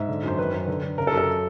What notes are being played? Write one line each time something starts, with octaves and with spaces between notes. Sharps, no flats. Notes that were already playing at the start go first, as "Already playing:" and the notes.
Already playing: G#2 E5
D3
F#2 C5
D#3 B4
F#2 B4
D3
D3
C#3 A#4
A4
F#2
A4